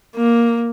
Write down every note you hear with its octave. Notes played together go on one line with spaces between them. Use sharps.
A#3